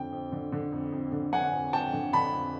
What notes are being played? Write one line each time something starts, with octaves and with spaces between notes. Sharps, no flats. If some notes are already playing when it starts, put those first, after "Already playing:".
Already playing: F2 D3 G5
F2
D3
D3
F2
F2
D3
D3 F#5 G#5
F2
F2 G5 A5
D3
D3 A5 B5
F2